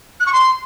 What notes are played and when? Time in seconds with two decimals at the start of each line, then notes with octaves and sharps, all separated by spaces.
0.20 F#6
0.26 C#6
0.33 C6